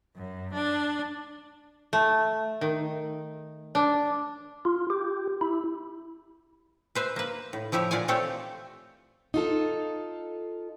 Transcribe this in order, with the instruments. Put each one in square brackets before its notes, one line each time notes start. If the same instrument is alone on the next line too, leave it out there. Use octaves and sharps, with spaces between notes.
[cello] F#2
D4
[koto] A3
D#3
D4
[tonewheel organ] F4
G4
E4
[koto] B4 C5 E5
A#3 B4
A2
F3 E4 G4 C#5 E5
A#2 F4 D5 F#5 G#5
A3 C4 F4 G4 A4 C#5
[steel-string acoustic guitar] D#4 F4 A4